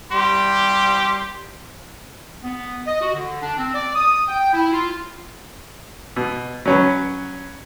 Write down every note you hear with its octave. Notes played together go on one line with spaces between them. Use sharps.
G3 G4 C6
B3
D#5
F#4
D3
D4
C4
D5
D#6
G5
E4
F4
B2
F#3 C#4 B4